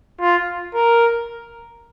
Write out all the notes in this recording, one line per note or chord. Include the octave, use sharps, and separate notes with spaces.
F4
A#4